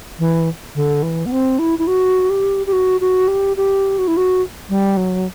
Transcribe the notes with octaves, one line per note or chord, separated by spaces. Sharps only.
E3
D3
E3
B3
C4
E4
E4
F#4
G4
G4
F#4
F#4
G4
G4
F#4
E4
F#4
G3
F#3